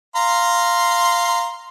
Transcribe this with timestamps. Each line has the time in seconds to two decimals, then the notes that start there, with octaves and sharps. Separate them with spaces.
0.16 F5 A#5 C6